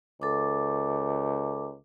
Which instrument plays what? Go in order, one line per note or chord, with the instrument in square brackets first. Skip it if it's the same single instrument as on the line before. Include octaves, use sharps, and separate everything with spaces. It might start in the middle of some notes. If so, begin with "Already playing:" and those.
[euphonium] C#2 [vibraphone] A4 D6